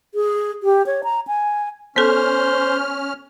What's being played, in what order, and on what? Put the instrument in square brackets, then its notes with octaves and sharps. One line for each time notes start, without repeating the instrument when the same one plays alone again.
[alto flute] G#4
G4
C#5
A#5
G#5
[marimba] B3 A4 [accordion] C#4 F6 [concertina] C5